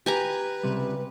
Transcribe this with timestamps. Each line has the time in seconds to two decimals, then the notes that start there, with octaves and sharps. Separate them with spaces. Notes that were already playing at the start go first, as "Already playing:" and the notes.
0.06 G4 B4 G#5 A#5
0.63 C#2 C3 G3